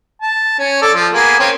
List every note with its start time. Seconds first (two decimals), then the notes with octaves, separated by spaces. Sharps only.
0.22 A5
0.59 C#4
0.82 A4 D5
0.95 F3
1.14 A#3 B3 G#4
1.39 A#3 C4 C#4